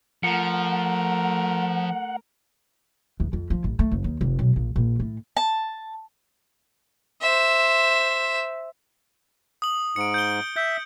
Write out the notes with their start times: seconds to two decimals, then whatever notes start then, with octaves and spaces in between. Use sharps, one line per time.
0.23 F3 A3 A#4 F#5
3.20 E2
3.33 F2
3.50 F3
3.64 A1
3.79 A3
3.91 F#1
4.04 D#2
4.21 F1
4.39 B1
4.56 A#1
4.76 A#1
4.99 A2
5.37 A5
7.21 C5 E5
9.62 D#6 F#7
9.96 G#2 C#7 D7
10.14 G6 D7 G7
10.56 E5 G6